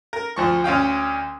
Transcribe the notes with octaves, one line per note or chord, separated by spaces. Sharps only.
A#4
D2 F3 C#6
D2 C#4 F5 G5